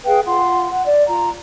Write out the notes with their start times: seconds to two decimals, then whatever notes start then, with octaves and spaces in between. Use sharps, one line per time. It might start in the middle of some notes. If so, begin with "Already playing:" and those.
0.06 G#4 B4 F5 G5
0.25 F4 F#5 C6
0.70 F#5
0.86 D5
1.08 F4 A#5